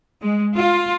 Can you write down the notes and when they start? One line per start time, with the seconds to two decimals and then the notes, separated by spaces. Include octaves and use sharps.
0.21 G#3
0.54 F4